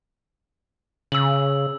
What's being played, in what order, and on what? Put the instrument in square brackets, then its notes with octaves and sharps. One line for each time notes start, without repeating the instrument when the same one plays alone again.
[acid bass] C#3 [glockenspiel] E6 F#7